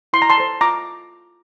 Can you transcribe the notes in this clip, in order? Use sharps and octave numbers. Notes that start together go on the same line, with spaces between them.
E4 C6
A#5
A5 C6
A4 C5
F4 A#5 D6